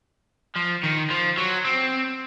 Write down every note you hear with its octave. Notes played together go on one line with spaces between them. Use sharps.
F3
D#3
F3
F#3
C4